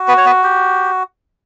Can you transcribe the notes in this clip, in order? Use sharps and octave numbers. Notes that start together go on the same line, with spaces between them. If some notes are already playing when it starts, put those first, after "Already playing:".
Already playing: F#4
B3 B4
C#5
B3 B4
G4